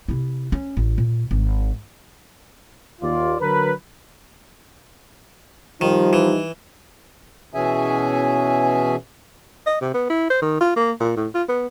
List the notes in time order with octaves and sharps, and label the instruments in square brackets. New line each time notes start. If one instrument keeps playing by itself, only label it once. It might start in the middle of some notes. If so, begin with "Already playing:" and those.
[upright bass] C3 E4
C#4
A1
A#2
G#1
[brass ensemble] D#2 F4 D5
D3 F#3 A#4 B4
[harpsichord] D#3 [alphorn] F3 [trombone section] G3 D#4
[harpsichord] E3
[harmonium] B2 E3 C#4 G#4 E5 G#5
[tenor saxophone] D#5
C3
B3
E4
C5
D#3
F4
A#3
A#2
A2
F4
B3